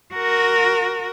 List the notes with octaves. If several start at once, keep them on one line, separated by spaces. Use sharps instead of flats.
F#4 A#4